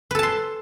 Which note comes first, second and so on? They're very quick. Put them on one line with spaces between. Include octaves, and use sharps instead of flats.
B4 A4 A5 C6